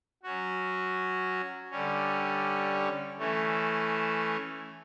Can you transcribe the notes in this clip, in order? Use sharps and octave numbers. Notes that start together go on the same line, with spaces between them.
F#3 C#4 F#4
D3 G3 C#4
E3 A3 C#4